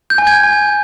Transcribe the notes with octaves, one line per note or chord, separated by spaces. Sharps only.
G6
G#5
G#6
G#5